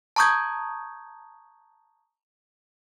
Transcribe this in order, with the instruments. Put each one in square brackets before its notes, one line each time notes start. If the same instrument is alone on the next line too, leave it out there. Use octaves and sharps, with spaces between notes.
[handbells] A5 A#5 C#6 D#6 G6 G#6